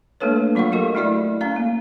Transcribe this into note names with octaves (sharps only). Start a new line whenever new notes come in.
A3 A#3 D4 A4 B4 C#5
F#3 F4 F5 F#5 C#6
F#4 G4 A4 A#4 D#5
A3 E4 F#4 D5 E5
C#4 F5 A#5
A#3